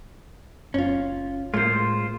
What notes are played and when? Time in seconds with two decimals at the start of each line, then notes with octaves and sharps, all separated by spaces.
0.74 F#1 C#4 F4
1.54 A2 G#3 A#3 F4 C5